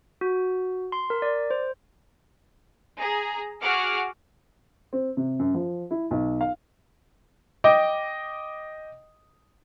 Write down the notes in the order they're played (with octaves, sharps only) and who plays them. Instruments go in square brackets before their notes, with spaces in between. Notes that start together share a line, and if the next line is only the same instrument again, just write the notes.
[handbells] F#4
C6
A#4
D5
C5
[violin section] G#4 A#5
F#4 G#4 F#5 D6 F6
[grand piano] C4
C3
F#2
F3
E4
B1
F5
[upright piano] D#5 G5 D6